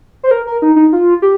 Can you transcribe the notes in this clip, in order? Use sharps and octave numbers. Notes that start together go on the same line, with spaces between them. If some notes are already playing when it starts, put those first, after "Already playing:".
C5
A#4
A#4
D#4
D#4
F4
G4